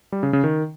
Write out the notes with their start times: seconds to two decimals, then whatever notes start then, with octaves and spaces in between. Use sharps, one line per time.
0.12 G3
0.23 C#3
0.33 C#3
0.44 D#3